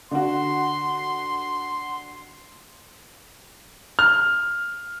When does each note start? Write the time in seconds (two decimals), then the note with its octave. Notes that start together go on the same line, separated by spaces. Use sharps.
0.11 D3 F#4 C6
3.99 F6